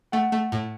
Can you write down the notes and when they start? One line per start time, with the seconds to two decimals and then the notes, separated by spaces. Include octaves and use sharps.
0.12 A3 F#5
0.32 A3
0.52 A2